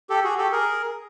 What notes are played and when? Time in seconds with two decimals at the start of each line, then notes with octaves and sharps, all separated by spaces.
0.10 G4 A4
0.24 F#4 G#4
0.38 G4 A4
0.52 G#4 A#4